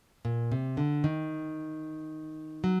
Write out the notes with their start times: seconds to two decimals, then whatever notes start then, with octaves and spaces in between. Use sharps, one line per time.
0.25 A#2
0.52 C3
0.77 D3
1.04 D#3
2.64 F#3